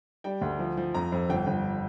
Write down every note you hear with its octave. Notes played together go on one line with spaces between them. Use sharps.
G3 G5
D2
F3
F3
F2 A#5
F2
G1 G5
G1